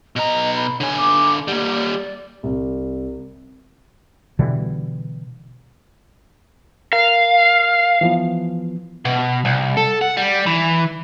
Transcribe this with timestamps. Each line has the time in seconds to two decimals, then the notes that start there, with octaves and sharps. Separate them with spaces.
0.16 B2 D#5 A#5
0.57 B5
0.80 D3 C#5 G#5
0.97 D6
1.48 G3 A#3 F#5
1.75 D5
2.43 C2
4.39 B2 D3 E3 G3
6.93 A#4 F5
8.01 E3 F3 B3
9.05 B2
9.45 C2
9.77 A4
10.01 F#5
10.17 G3
10.46 E3